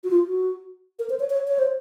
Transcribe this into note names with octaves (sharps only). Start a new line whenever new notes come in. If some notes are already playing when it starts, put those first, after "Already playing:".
F#4
F4
F#4
A#4
C5
C#5
C#5
C#5
C5